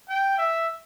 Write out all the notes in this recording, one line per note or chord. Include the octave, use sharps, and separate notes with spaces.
G5
E5